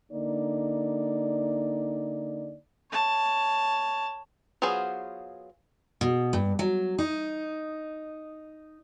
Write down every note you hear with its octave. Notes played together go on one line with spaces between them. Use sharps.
D3 A#3 D#4 D5
C#5 A5
F#3 B3 F4 G#4 C5
B2
G2
F#3
D#4